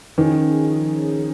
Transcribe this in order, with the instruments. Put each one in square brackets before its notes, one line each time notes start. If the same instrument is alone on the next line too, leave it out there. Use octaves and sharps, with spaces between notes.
[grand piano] D#3 [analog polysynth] F3 C#4 G#4